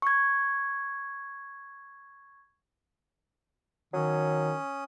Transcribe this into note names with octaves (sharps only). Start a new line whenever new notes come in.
C#6 G#6
D#3 F#3 C#4 D#6